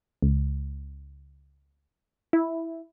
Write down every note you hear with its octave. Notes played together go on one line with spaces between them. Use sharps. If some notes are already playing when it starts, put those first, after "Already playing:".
C#2
E4